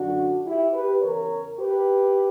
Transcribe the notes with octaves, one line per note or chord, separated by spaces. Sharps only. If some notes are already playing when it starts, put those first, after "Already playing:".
Already playing: F#2 D3 D4 F#4
E4 G4
G4 B4
E2 C#3 E3 A#4 C#5
G4 B4